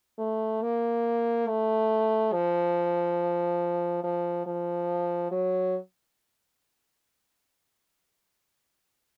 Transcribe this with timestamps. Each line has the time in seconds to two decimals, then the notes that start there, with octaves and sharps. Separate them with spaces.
0.18 A3
0.62 A#3
1.47 A3
2.33 F3
4.03 F3
4.46 F3
5.31 F#3